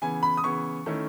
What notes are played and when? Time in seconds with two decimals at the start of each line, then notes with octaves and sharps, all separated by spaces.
0.02 C#3 E3 B3 G#5
0.23 B5
0.37 D#6
0.44 C#3 E3 B3 C#6
0.86 D#3 A3 C#4 E4